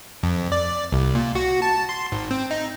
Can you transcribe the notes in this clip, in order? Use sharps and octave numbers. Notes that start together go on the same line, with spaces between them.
F2
D5
C2
A#2
F#4
A5
C6
G#1
C4
D#4